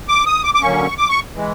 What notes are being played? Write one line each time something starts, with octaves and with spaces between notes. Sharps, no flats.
D6
D#6
D6
D6
D3 F#3 A#3 C#4 C#6
D6
C#6
E3 G#3